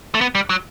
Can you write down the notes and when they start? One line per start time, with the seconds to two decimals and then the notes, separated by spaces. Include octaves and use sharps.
0.14 A3
0.21 B3
0.35 G3
0.50 F#3